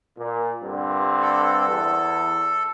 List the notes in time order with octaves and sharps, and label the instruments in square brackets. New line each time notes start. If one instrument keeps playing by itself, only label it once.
[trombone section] A#2
G2 D3 C4
[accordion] A4
[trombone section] E2